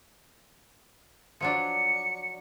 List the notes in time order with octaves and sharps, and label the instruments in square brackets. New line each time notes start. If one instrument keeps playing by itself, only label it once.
[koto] F3 F#3 D4 [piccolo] C#7